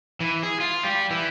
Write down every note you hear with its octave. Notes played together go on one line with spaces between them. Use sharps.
E3
G#4
F4
G3
E3